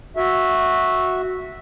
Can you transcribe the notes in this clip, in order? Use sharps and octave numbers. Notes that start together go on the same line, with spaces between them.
F#4 E5